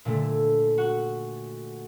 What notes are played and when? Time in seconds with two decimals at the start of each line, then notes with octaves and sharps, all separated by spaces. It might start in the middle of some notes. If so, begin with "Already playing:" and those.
0.05 A#2 D3 A3
0.78 F#4 F#5